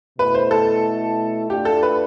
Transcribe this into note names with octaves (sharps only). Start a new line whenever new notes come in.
B2 A3 E4 B4
C5
A4
A3 D4 F4 G4
A4
B4